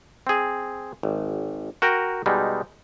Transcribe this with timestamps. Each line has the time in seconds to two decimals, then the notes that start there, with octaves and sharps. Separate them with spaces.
0.27 C4 G#4
1.03 G#1
1.82 F#4 A#4 G5 A#5
2.26 B2 G3 G#3 D#4